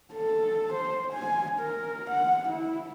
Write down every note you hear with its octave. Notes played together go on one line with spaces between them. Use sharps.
A4
C5
G#5
A#4
F#5
E4